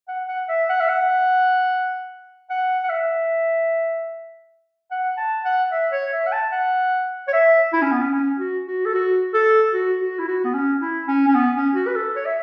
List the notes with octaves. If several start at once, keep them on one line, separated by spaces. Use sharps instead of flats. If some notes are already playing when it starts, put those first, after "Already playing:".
F#5
F#5
E5
F#5
E5
F#5
F#5
F#5
E5
F#5
A5
F#5
E5
C#5
E5
F#5
A5
F#5
C#5
E5
E4
C#4
B3
C#4
C#4
F#4
F#4
A4
F#4
A4
F#4
F#4
E4
F#4
B3
C#4
E4
C#4
C#4
B3
C#4
F#4
B4
A4
C#5
E5